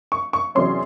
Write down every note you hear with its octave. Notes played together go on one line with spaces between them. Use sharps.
C#6
C#6
E2 C3 F#3 C#4 C6